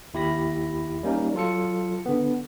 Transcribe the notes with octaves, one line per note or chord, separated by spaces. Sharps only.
D#2 E4 G4 B5 A#6
G3 A#3 C#4 D#4
F#3 F4 A4 C#7
D3 B3